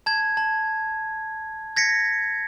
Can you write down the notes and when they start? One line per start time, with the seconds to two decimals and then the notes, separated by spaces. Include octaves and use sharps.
0.06 A5 G#6
0.37 A5
1.76 G#6 A#6 B6 C#7